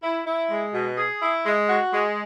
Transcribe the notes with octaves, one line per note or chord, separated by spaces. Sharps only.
E4
E4
G#3
B2
G#4
E4
G#3
F#4
G#3